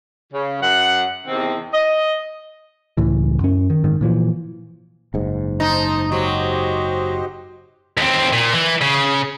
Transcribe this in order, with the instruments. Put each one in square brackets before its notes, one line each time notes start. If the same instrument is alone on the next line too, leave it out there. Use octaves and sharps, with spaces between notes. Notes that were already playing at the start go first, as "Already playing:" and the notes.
[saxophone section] C#3
F#2 F#5
E2 C3 D#3 C4
D#5
[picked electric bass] C#2 A2 E3
F#2 C#4
D#3
G#2 D#3
A#2 E3 F3
[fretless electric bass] F#1 G#2
[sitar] D#4 [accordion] C5 A5 A#5
[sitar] F#3 [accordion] G4 C5 D#5
[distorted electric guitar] D#2 C4
A#2
E3
C#3